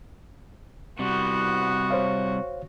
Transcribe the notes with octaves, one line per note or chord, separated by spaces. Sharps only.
C3 G3 B3 F#4
C5 C#5 F5